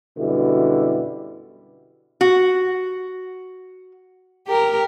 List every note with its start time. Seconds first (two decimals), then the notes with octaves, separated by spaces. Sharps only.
0.18 F#2 B2 D3 G3 E4
2.21 F#4
4.47 G4 A#4